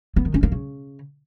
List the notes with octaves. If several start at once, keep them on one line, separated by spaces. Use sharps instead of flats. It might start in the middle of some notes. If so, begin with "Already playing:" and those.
B3
D#3
C#4
A#3
C#3